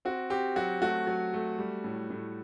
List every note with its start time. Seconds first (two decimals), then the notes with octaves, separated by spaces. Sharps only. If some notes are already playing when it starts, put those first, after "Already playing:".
0.05 C4 F#4
0.30 C4 G4
0.56 F#3 F#4
0.82 A3 F#4
1.07 F#3
1.33 A3
1.58 G3
1.84 A2
2.10 A2